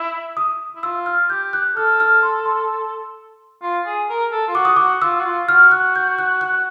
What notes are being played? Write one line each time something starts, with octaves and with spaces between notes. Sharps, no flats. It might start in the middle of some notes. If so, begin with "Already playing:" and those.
Already playing: E4
D#6
E4
F4 E6
F6
G4 G6
F#6
A4 F6
F6
C6
C6
F4
G#4
A#4
A4
F4
F#4 D6
D#6
F#4 D6
F4 E6
F#4
F4
F#4 F6
F#6
G6
F#6
F#6